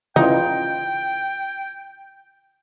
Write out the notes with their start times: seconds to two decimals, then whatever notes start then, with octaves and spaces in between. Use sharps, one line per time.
0.16 C#3 E3 D#4 F4 G5